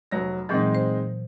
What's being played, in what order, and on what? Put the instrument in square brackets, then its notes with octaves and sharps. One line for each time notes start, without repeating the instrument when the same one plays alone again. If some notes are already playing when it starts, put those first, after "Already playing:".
[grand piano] F1 F#3 A#6
[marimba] A#2 E3 F#3 [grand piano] G#3 C4 D#4
[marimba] C5